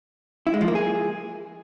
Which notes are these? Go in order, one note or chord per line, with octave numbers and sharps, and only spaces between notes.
E4
G#3
F3
A#3
G#4